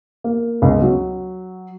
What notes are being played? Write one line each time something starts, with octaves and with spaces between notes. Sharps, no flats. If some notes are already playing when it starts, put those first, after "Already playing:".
A#3
C#2
F#3